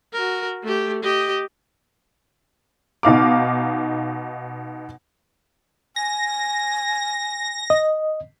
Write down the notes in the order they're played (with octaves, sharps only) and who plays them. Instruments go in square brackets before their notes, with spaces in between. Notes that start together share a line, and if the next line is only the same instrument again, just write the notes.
[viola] F#4 A#4
A3 G4
G4 D#5
[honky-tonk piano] B2 D#4 F5 D6
[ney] G#5 [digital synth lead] A#6
[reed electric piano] D#5